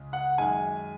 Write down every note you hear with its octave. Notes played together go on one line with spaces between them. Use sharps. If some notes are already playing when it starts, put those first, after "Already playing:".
Already playing: C#2 C#3 G#3
F#5
F#2 D#3 G#3 G#5